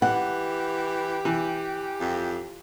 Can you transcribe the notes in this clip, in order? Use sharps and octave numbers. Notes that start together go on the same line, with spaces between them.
E3 G4 F#5
E3
F2